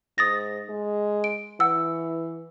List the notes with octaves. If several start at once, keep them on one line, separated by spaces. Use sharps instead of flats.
G#2 D#6 A6 A#6
G#3
D7
E3 F#5 E6